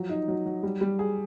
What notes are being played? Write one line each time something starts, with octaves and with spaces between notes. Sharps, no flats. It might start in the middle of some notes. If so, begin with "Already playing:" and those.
Already playing: F3 F#3
D#4
F#3
F#3
G3
G3
G#4